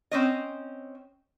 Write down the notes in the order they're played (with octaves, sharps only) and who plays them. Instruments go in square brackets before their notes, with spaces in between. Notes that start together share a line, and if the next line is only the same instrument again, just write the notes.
[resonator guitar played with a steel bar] C4 C#4 D#5